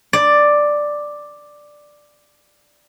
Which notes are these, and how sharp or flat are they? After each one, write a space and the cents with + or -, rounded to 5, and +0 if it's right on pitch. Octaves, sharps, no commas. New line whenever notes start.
D5 +5